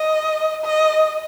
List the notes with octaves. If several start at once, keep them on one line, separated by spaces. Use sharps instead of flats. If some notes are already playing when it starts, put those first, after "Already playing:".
Already playing: D#5
D#5